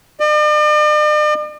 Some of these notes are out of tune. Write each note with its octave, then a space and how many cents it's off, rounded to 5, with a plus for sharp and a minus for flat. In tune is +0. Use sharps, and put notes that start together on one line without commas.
D5 +45